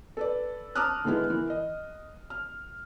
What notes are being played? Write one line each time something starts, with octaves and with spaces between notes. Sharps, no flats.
A4 B4 D5
A5 A#5 D6 D#6 F6 F#6
D3 E3 G#3 B3 E4
E3 A#4
D#5
F6